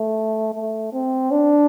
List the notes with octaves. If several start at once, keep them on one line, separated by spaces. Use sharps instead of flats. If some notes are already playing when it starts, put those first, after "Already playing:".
Already playing: A3
A3
C4
D4